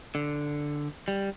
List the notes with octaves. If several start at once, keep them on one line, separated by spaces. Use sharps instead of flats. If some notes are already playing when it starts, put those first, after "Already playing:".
D3
G3